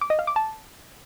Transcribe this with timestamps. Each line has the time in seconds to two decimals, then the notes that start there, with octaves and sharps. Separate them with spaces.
0.01 D6
0.10 D#5
0.19 F5
0.27 D6
0.36 A5